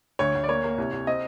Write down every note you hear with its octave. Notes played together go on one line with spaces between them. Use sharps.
D2 C#5
D2
D5
A#3 C#5
A#3
C2
C2
C4 D#5